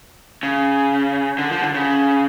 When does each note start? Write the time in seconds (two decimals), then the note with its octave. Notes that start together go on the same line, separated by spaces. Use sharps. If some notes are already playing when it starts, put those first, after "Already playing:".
0.43 C#3
1.38 D3
1.51 F3
1.62 D3
1.74 C#3